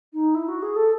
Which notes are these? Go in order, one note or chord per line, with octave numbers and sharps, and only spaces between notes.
D#4
E4
F#4
G#4
A4